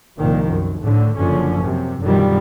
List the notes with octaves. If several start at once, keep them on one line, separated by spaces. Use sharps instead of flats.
C2 A#2 D#3 F3
F#2
A2 D3 A3
F#1 F#2 D3 F3 C#4
F#2 C3
F#2 B2 D3 D#3 F3 G3